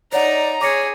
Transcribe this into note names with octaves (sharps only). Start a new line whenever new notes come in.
D#4 C#5 D5 F#5 A#5
G#4 C#5 D6 A#6 C#7